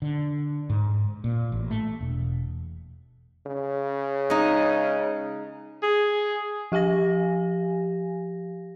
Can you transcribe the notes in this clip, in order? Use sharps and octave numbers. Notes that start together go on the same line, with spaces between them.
D3
G#2
A#2
A1
A3
E1
C#3
G#3 D#4
G#4
F3 G4 F5 G#5 A#6